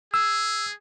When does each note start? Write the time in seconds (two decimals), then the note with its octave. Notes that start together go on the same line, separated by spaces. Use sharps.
0.14 G#4 E6